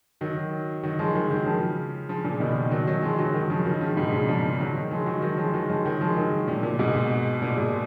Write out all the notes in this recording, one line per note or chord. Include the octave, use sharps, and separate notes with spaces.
D#3 F#3
D#3 F#3
F3 G#3
D#3 F#3
D#3 F#3
C#3 F3
C#3 F3
A#2 C#3
B2 D#3
D#3 F#3
D#3 F#3
F3 G#3
D#3 F#3
D#3 F#3
C#3 F3
D#3 F#3
C#3 F3
G#2 B2
A#2 C#3
C#3 F3
D#3 F#3
F3 G#3
D#3 F#3
D#3 F#3
F3 G#3
D#3 F#3
F3 G#3
D#3 F#3
F3 G#3
D#3 F#3
A#2
A#2
G#2 B2
A#2
G#2